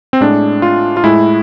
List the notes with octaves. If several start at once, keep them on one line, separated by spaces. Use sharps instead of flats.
C4
A2 G#3 D4
F4
F4
A2 G#3 E4